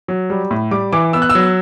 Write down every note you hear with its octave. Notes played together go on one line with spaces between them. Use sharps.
F#3
G3
A2
G3 D6
E3 D6
B3 E6
F#6
E6
F#3